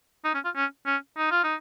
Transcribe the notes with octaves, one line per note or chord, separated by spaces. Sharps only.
D#4
C#4
F4
C#4
C#4
D#4
F4
D#4